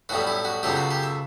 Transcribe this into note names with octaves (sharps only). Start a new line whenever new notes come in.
B1 A2 G3 B3 F#4
E4
F#4
C#2 B2 F#3 A3 G4
F#4
G4
E5